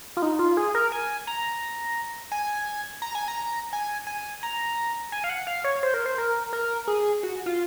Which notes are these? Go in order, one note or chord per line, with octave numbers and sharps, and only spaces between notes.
F4
D#4
F4
G#4
A#4
G#5
A#5
G#5
A#5
G#5
A#5
G#5
G#5
A#5
G#5
F5
F#5
F5
C#5
C5
A#4
C5
A#4
A#4
G#4
F#4
F4